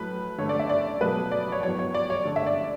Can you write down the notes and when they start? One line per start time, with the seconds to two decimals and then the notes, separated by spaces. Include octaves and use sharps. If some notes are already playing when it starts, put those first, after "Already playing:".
Already playing: A2 F#3 A3 B4
0.38 D3 A3 C#5
0.49 D5
0.59 E5
0.69 D5
1.01 B2 F#3 A3 B4
1.31 D5
1.52 C#5
1.63 A2 F#3 B3 C#5
1.79 C#5
1.94 D5
2.10 C#5
2.25 D3 A3
2.36 E5
2.46 D5